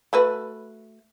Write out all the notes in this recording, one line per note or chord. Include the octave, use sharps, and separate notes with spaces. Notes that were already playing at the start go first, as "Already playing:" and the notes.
A3 F#4 B4